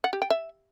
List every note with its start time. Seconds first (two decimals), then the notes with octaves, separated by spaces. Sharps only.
0.04 F#5
0.13 G4
0.22 G5
0.30 E5